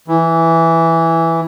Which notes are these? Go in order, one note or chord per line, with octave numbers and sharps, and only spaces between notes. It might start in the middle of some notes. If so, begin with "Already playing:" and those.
E3